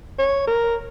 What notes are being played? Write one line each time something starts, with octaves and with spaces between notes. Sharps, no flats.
C#5
A#4